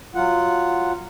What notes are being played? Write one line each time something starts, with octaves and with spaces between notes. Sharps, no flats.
F#3 F4 F#5